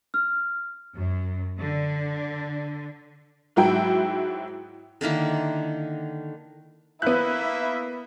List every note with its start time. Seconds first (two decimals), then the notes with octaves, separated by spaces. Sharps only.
0.14 F6
0.95 F#2
1.60 D3
3.56 G#2 F#3 E4 F#4 G5
5.01 D3 D#3 A#3 E4
7.02 A#3 B3 E4 E5 F#6